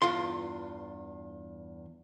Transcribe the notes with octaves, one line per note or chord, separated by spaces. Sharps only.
E2 G2 F4 C6